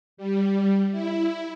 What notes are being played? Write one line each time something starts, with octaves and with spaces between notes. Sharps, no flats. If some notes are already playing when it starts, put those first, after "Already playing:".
G3
E4